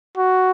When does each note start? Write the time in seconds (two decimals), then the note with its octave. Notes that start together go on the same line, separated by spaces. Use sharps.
0.17 F#4